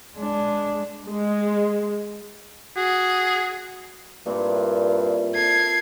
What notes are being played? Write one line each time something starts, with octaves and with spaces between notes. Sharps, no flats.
G#3 D4
G#3
F#4 G#4
G2 A#2 C4 E4
A4 G#6 C7